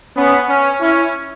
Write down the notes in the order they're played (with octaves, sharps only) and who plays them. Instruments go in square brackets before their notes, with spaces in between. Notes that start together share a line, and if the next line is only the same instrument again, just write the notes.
[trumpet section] B3 [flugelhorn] C#4
[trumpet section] C#4
[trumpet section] C#4 [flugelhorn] E4